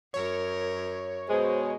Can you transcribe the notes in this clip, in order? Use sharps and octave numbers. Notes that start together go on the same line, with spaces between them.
F#2 A#4 C#5
B2 G#3 C5